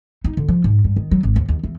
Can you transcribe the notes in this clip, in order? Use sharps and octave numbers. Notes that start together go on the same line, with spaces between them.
D#4
D3
F3
G#2
G2
D#3
F#3
G#1
D#2
D#2
E2